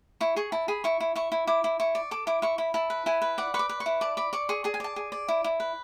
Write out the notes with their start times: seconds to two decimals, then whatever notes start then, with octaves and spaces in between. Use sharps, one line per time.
0.21 E4 C#6
0.36 G#4 C#6
0.52 E4 A5
0.68 G#4 B5
0.84 E4 C#6
1.00 E4
1.16 E4 C#6
1.32 E4
1.47 E4 D6
1.64 E4
1.80 E4 C#6
1.95 D5
2.11 A4 D6
2.27 E4 D6
2.42 E4 C#6
2.58 E4 B5
2.74 E4 A5
2.90 B4
3.06 E4 G#5
3.22 B4
3.38 D5 F#5
3.54 B4 C#6
3.59 D6
3.69 B4
3.80 C#6
3.86 E4
4.01 D5 A5
4.17 D5 B5
4.33 D5 C#6
4.49 G#4 C#6
4.64 G#4 A5
4.74 G#5
4.80 D5 A5
4.96 G#4
5.12 D5
5.28 E4
5.44 E4
5.60 B4